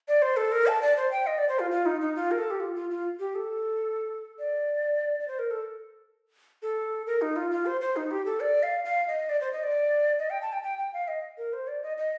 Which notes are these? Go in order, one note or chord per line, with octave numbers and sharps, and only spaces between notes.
D5
C5
A4
A#4
A5
D5
C5
G5
D#5
D5
C5
F4
F4
D#4
D#4
F4
A#4
A4
G4
F4
F4
F4
G4
A4
D5
D5
C5
A#4
A4
A4
A#4
D#4
F4
F4
C5
C5
D#4
G4
A4
D5
F5
F5
D#5
D5
C5
D#5
D5
D#5
G5
A5
G5
G5
G5
F5
D#5
A#4
C5
D5
D#5
D#5